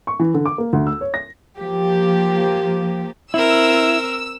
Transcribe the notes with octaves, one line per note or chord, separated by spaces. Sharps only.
C#6
E3
D3
D6
A#3
D2
E6
C#5
A#6
F3 A#3 G4
C4 E4 A#4 E6